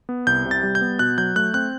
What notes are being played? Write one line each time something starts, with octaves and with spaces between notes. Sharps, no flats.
B3
C2 G6
C3
A6
G3
G6
B3
B2 F#6
F#3 G6
A3 F#6
C4 F#6